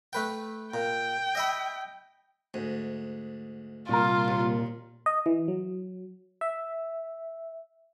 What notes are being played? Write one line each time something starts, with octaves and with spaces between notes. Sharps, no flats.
A3 B4 G5
A#2 G5
D#5 E5 B5
D2 G#2
C2 A#2 F4 A#4
D#2
D#5
E3
F#3
E5